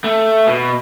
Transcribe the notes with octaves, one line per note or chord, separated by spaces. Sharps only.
A3
B2